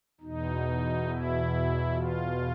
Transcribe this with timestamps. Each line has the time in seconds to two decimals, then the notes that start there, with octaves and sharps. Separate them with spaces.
0.21 E2 B2 D#4
1.07 E4
1.93 F4